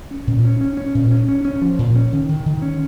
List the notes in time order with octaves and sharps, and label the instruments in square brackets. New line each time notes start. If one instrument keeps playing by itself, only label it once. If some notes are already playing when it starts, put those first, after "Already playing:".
[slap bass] C#4
A#2
C#4
C#4
C#4
A#2
C#4
C#4
C#4
F3
A#2
C#4
D#3
D#3
D#3
C#4